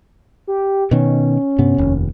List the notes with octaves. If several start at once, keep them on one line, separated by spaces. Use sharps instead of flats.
G4
B2 D#3 C#4
G2 C3 B3
F1 D#2